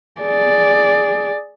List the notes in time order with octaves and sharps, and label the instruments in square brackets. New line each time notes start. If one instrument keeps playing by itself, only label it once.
[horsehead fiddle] G#4 D5